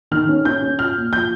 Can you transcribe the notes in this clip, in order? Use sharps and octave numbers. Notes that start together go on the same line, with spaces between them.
D#3 F6
C#4
C#4 G6
C#4
F4 F6
A#2
F3 G6